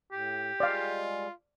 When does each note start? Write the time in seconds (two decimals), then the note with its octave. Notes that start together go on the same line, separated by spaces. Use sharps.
0.12 A2 G4
0.60 G3 G#3 F4 D5 F5